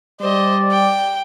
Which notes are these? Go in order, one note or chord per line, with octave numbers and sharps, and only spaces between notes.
G3 C5 D5 D#5
G5